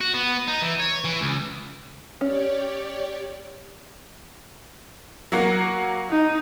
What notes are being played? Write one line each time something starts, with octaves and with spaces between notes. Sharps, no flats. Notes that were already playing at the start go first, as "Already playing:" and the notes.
F#4
B3
D#4
E3
C#5
E3
C#2
C#4 G4 C#5 D5
F#3 A#3 F#4
D#4